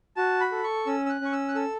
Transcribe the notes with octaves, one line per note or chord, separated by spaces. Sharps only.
F#4 A5
B5
A4
C#6
C#4 E6
E6
F#6
C#4 C#6
E6
F#6
A4 E6